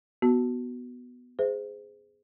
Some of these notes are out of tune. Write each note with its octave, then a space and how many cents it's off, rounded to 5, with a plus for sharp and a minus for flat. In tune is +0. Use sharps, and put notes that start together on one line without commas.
B3 +0 F#4 +10
G#4 +0 C5 -30 E5 +0